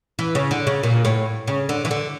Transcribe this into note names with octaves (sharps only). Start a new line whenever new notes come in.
E3
C#3
D3
C#3
A#2
A2
C#3
D3
E3
D3